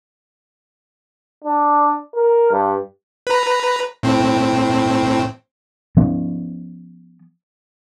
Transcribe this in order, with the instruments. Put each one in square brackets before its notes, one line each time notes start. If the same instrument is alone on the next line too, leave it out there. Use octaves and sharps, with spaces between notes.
[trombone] D4
A#4
G2
[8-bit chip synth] B4 A#5
A2 C4
[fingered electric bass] F3 B3 C#4